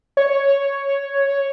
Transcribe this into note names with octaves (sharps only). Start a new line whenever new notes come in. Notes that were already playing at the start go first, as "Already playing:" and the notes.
C#5